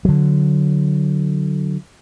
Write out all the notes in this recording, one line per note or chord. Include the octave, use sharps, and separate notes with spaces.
D3 F#3